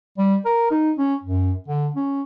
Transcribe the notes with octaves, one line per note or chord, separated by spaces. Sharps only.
G3
A#4
D#4
C#4
F#2
D3
C#4